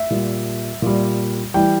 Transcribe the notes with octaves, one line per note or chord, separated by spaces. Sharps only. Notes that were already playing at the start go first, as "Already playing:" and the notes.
Already playing: E5
A#2 G3
A#2 G3
E3 G3 G5